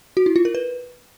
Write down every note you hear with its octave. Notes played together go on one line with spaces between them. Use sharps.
F#4
E4
F4
A#4
B4